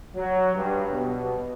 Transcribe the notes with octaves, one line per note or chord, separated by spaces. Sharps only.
F#3
G2
B2